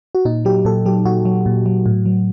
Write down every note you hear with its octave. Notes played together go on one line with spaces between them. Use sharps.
F#4
A#2 D#4
F#3 G4
A#2 A4
F#3 G4
A#2 F#4
F#3
A#2
F#3
A2
F#3